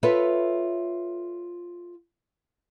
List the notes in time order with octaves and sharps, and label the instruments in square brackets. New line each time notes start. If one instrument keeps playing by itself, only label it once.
[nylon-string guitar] F4 A4 B4 C#5 E5